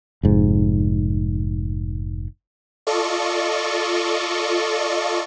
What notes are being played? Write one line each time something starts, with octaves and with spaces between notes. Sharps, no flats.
F1 G#2
F4 A4 D5 D#5 C#6